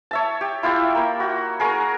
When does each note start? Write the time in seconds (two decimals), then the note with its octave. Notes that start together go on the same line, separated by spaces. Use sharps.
0.11 C#5 E5 A5
0.41 G4
0.63 E4 F4 G4 E5
0.95 A#3 B5
1.20 F#4
1.60 G#4 A#4 C#6